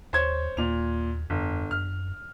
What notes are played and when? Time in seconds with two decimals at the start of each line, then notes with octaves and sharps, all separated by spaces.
0.13 D#2 C5 C#5 G#6
0.57 D#2 A#2 F7
1.30 G1 F2
1.71 F#2 F6